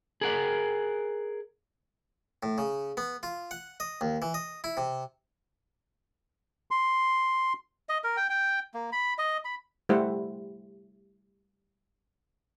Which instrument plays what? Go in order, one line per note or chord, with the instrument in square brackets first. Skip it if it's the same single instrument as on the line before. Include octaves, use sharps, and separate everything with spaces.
[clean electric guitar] G#4 A#4 F#5
[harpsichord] A2
C#3
B3
F4
F#5
D#5
D#2
E3
D#5
E4
C3
[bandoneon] C6
[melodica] D#5
A#4
G5
G5
A#3
B5
D#5
B5
[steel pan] G3 A3 E4 C5 F#5